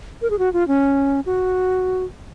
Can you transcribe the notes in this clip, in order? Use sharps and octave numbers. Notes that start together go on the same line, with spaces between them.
A#4
G#4
F#4
F4
C#4
F#4